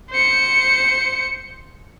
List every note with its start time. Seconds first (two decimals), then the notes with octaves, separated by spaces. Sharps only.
0.11 C5 C#7